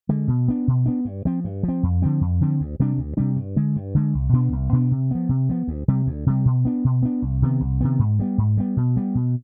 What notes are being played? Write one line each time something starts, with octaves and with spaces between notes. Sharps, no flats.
D3 G#3
B2
B3 D4
B2
B3 D4
G2
F3 C4
G2
F3
C4
F2
D3 F3 C4
F2
D3 F3 C4
D2
C3 G3 D4
D2
C3 G3 D4
G2
D3 G#3
G2
D3 G#3
C2
B2 B3 D4
C2
B2 B3 D4
C3
F3 B3
C3
F3 B3
D2
C3 G3
D2
C3 G3
B2
B3 D4
B2
B3 D4
C2
C3 D#3 B3
C2
C3 D#3 B3
G#2
G3 B3
G#2
G3 B3
B2
G3 B3
B2